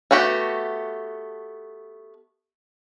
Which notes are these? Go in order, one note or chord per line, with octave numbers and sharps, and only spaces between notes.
A3 B3 F#4 G4